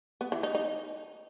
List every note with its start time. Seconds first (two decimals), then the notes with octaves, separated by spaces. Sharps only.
0.21 B3
0.32 E3
0.43 D#4
0.55 D#4